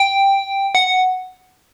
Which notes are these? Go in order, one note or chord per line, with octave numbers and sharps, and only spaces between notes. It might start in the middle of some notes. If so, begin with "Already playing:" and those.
Already playing: G5
F#5